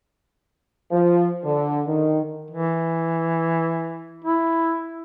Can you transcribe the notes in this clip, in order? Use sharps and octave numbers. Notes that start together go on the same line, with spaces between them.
F3
D3
D#3
E3
E4